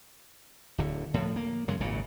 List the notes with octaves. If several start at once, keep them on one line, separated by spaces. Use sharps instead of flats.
D1 D3
A2 F3
A#3
F#2 C#3 G#3
G#1 C#2 A#2 C#3